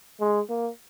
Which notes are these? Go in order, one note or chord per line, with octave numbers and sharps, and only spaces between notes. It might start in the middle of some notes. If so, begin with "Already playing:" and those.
G#3
A#3